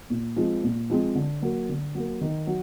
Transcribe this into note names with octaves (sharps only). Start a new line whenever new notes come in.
A#2
F3 G#3 C4
A#2
F3 G#3 C4
D3
F#3 A#3
D3
F#3 A#3
D#3
F#3